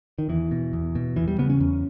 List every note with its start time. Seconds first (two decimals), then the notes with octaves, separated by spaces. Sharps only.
0.19 D#3
0.29 E2 E3
0.51 B2
0.73 E2
0.95 B2
1.16 E2 E3
1.28 G3
1.38 C#3 B3
1.50 C#4
1.60 E2